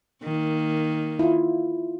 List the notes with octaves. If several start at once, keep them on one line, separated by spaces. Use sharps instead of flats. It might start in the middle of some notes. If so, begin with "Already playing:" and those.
D#3 A#3
E4 F4